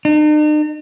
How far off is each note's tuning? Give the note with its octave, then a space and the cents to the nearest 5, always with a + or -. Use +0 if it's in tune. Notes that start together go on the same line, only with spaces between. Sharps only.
D#4 -45